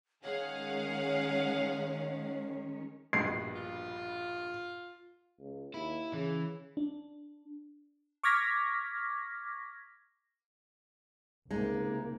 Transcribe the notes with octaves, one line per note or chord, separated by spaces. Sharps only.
D#3 G#3 C#4 G#4 C#5 F5 F#5
A#1 G2 B2 C7
F4
C#2
D#2 E4
C#3 E3
D4
C#6 D6 F6 G#6 A#6 B6
C#2 C3 G#3 A#3 D#4